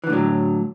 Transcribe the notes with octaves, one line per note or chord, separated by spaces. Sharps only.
A2 D3 E3 F#3